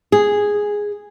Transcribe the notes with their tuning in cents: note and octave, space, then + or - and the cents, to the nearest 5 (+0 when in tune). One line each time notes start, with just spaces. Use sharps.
G#4 -5